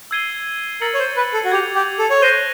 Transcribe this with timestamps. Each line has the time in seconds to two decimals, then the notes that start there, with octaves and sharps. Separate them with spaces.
0.11 E6 G#6 C7 D#7 G7
0.81 A#4 E6 A6 C#7 F#7
0.94 C#5
0.99 C5
1.16 B4
1.33 A4
1.45 F#4
1.51 G4 G#6 C#7 F7
1.75 G4
1.99 A4
2.10 C#5
2.22 C5 F#6 A#6 D#7 G7